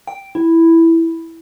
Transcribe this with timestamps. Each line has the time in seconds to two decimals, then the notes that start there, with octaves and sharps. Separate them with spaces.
0.07 G5
0.35 E4